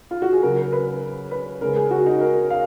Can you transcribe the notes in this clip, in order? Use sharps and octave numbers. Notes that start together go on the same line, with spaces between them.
F4
F#4
G#4
C#3 F#3 A#4
A#4
B4
B4
C#3 G#3 A#4
G#4
F#4
D#4
A#4
F5